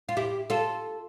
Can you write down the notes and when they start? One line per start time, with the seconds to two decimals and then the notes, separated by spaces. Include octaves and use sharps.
0.09 F4
0.17 E4 G4
0.50 F4 A4